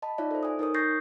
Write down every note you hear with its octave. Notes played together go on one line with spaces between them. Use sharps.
D#5 A5 B5
D#4 F4 C#5 D5 E5
A4 C5
G#5 D#6
D#4 A#4 C#5 D#6
C#6 G6 A6 A#6 C7